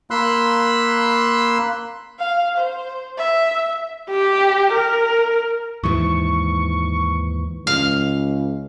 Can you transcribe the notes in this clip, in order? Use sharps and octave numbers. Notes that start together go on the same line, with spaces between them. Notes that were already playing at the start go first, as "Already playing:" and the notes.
A#3 B5 C6 E6 F#6
F5
C5
E5
G4
A#4
D#2 G#2 E3 C#6
C#2 F5